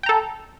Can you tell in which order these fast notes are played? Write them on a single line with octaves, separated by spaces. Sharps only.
G5 A#5 A4